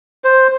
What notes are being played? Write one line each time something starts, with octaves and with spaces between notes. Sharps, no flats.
C5